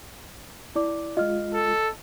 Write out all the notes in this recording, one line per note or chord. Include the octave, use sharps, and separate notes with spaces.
E4 D5 D6
G#3 F4 D#5 F6
A4